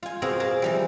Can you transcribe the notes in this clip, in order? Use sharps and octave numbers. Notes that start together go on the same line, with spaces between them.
F4 G#5
B2 C4 F4 G#4 A#4
G#4 A#4 A5
E3 F3 G3